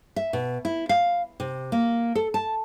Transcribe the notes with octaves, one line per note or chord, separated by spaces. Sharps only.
E5
B2
E4
F5
C3
A#3
A4
A5